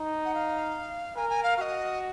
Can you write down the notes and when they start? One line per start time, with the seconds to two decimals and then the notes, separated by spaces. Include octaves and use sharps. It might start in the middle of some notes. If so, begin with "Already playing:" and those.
Already playing: D#4
0.25 F#5
0.34 F5
1.16 A#4 G#5
1.30 G#5
1.43 F5
1.57 F#4 D#5 F5